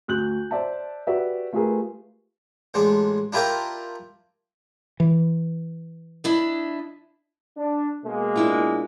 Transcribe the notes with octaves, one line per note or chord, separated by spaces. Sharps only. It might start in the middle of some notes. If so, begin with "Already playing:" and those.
D2 F#6 G6 F#7
C5 D5 E5 A5
F#4 G4 B4 D5 E5
A3 F4 G4 G#4 A#4 B4
A1 G#3 D4
D4 E4 F4 G4 A#4 D5
E3
D4 E4 D#5
D4
B2 G#3 A#3
D4 E4 F4